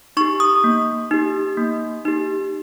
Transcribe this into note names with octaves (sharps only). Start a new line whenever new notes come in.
D#4 G4 C#6
D#6
A#3
D#4 G4
A#3
D#4 G4